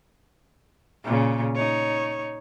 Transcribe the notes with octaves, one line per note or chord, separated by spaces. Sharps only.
A#2 C#3
D#4 C#5